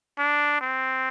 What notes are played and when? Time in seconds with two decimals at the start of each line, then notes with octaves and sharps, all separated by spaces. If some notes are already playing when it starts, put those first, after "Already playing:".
0.18 D4
0.61 C4